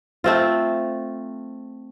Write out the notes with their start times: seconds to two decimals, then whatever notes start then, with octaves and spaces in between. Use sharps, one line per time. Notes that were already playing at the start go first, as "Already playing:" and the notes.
0.24 A3 C4 F4